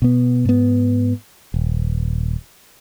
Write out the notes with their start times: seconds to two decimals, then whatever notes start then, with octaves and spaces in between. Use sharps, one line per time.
0.02 B2 B3
0.45 G#2 B3
1.54 D#1